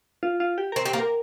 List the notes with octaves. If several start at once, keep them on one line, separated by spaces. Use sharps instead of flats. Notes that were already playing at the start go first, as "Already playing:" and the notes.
F4
F4
G4
C4 A#4
C4 G4
A#3
A#4